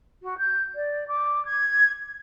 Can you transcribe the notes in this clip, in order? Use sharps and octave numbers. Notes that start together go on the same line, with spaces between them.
F#4
G6
D5
D6
G#6